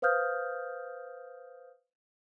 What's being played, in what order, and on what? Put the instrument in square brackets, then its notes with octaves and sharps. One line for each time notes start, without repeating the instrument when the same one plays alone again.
[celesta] B4 C5 F5 D#6 F6 G6